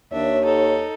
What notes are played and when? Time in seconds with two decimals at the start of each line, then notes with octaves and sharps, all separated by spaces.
0.12 D#2 D4 C#5 E5
0.45 D#4 A4